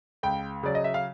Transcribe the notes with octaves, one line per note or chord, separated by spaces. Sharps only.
C#2 G5
C#3 F#3 D5
D#5
E5
F5